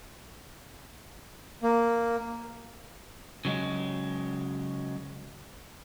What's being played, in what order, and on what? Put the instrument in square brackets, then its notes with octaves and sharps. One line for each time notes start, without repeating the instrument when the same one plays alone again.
[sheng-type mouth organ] A#3
[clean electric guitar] C#3 F#3 G#3